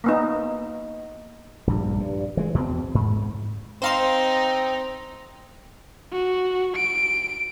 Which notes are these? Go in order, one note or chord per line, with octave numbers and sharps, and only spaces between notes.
A#3 B3 D#4
A#1 G2
G2
E3 G#3
E2 B2 C4
G#2
C4 D#4 C5 F5 C6
F#4
D7